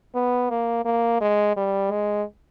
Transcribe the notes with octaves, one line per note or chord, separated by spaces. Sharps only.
B3
A#3
A#3
G#3
G3
G#3